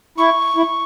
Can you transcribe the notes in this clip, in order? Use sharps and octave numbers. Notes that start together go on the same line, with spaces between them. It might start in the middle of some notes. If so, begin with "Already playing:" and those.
E4 C#6
E4